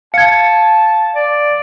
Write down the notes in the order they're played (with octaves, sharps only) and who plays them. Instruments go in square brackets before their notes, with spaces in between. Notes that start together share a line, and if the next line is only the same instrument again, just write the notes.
[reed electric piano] F5 [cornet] A5 [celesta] G#6 C#7
[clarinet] D5